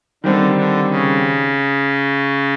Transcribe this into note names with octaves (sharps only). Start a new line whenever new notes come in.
D3 D#3 G3 C4
D3
C#3